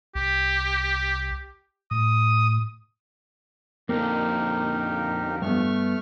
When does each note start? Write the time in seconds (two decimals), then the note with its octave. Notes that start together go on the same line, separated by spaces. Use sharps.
0.15 C2 G4
1.91 A2 D#6
3.89 F2 D3 A#3 D#4 G4 A#4
5.42 G2 A3 B3 C#6 F6